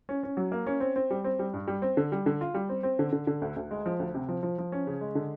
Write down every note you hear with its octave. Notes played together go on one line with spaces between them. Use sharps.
C#4
C#4
F#3
A#3
C#4
C4
C4
G3
C4
G3
G2
G3
C4
D3
G3
D3
F4
G3
C4
C4
D3
D3
D3
D2
D2
G#3
F3
D2
C3
F3
F3
F3
C#4
C#3
G#3
D3